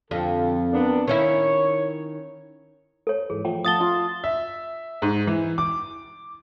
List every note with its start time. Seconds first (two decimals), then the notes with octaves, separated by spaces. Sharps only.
0.11 F2 D3 F3 A4
0.72 A#3 B3 D4
1.08 D#3 C#4 E4 C#5
3.07 A4 C#5
3.30 G#2 E3 G#4
3.45 F3 A3 G5
3.65 F5 F#5 A5 D#6 A6 G7
3.80 F4 C6
4.24 E5
5.02 G#2
5.27 E3
5.58 D6